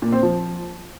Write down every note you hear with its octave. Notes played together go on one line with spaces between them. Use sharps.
A#2
C4
F3